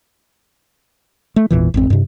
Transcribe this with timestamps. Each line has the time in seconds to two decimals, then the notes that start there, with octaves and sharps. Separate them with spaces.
1.36 A3
1.51 G#1 E2 A#2 E3
1.74 G#1 F2 C4
1.90 G2 C3